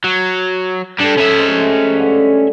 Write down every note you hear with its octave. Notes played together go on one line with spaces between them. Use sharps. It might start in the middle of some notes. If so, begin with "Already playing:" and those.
F#3
G3 D4 A4
C#4 E5
C3 G#3 A3
G2 D3